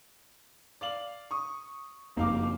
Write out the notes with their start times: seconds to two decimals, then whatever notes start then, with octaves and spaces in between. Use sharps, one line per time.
0.81 D5 F5 F#7
1.31 C#6 D#6
2.17 F#1 F2 A#3 D#4 F5 D6